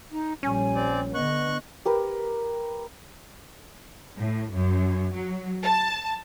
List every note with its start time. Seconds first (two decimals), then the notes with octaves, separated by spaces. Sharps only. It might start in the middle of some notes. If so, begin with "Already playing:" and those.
0.12 D#4
0.43 A#1 G3 C#4 G#5
0.75 C4 D5
1.14 D3 B3 D#5 C#6 F#6
1.85 G4 A#4 B4
4.16 A2
4.52 F#2
5.13 F#3
5.63 A5